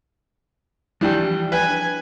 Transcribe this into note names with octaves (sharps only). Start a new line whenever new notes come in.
E3 F3 G3 D4 G5
B4 G#5